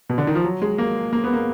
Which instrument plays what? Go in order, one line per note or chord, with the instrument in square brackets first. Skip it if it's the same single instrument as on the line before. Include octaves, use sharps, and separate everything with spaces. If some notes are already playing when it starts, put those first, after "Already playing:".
[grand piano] B2
D3
D#3
F3
F#3
G#3
A#3
A#3
B3
A#3